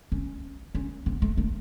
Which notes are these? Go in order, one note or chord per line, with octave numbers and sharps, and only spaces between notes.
C#4
C#4
B3
A3
A3